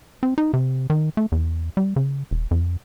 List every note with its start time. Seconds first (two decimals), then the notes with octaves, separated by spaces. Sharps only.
0.23 C4
0.38 D#4
0.54 C3
0.90 D#3
1.17 A3
1.32 E2
1.77 G3
1.96 C#3
2.31 E1
2.51 F2